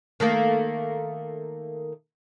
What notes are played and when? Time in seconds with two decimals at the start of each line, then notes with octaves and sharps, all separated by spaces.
0.20 D#3 A3 A#3